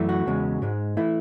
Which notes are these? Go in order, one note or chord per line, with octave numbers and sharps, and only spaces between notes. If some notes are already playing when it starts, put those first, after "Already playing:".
Already playing: F#2 E3 A3
F#4
E2 C#3 G#3
G#2 G#3
E3 A3 E4